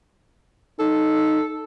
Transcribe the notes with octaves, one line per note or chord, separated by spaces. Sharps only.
D#4 A4